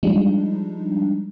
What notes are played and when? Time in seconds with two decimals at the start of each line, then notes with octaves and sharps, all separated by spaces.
0.03 F3 G3 G#3 D4 D#4